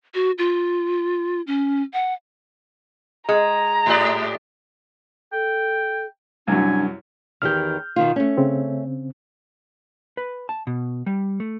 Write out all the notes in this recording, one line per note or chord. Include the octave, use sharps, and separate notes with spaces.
F#4
F4
C#4
F#5
G#3 A#5
G#2 G4 D5
A4 G5
C2 F#2 D4 G#5
E2 D#3 G4 F6 G6
B2 D#3 F4
A3 C#4
C#3 C4
B4
A5
B2
G3
A3